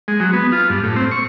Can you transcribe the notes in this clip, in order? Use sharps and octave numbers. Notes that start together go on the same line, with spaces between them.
G#3
F#3
B3
F4
G2
A2
C4
C#6